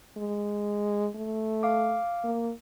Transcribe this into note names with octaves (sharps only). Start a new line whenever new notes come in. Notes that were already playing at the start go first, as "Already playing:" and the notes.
G#3
A3
F5 D6
A#3